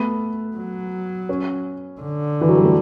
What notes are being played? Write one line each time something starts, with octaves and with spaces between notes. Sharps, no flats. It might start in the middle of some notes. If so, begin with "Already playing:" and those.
Already playing: A3 B3
F#3
C#4
D3
E3
F#3
G3
A3